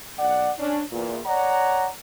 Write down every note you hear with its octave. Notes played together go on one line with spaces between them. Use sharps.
B1 D5 F#5
C#4 D4
E2 A#2
C#5 D5 F#5 A#5